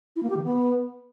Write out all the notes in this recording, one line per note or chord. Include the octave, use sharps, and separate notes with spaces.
E4
A#3
G4
D#3
B3